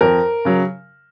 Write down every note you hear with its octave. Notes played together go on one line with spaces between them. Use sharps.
F2 A#4
C#3 F#3